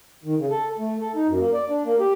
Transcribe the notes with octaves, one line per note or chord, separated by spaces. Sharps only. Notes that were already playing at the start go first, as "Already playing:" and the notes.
D#3
C#3
A4
A3
A4
D#4
F#2
A#3
D5
D4
A#3
G4